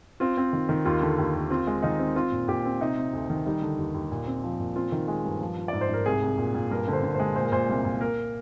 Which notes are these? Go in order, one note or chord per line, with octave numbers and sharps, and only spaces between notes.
C4 F4
C4
D#3
D#3
D#2 F4
D3
D#2
D#2
C4 F4
G#3
D#3 D#4
C4
C4 F4
A#2
A#2 G4
C4
C3 D#4
C3
D2
D#3
G3 D#4
D3
D#2
D#2
A#2
C4
F3
A#2
C4 F4
D#3
G#3
G2
F3
F3
G#2 D5
C5
G#2 A#4
C2 G#4
C2
A#2
A#2
G2 A#4
D3
C5
D3
C5
G#3
A#2 C5
A#4
A#2 C5
C2
A#2
A#3 A#4